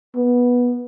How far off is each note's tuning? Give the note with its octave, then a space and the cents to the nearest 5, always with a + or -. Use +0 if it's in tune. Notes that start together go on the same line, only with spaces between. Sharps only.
B3 -15